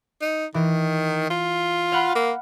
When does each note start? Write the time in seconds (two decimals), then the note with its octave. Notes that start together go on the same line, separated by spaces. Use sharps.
0.22 D#4
0.54 D#3 E3
1.30 F4
1.92 F5 F#5 B5
2.15 A#3